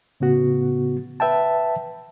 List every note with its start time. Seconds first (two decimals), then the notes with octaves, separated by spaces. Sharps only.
0.20 A2 C#3 B3 F#4
1.20 B4 E5 G5 A5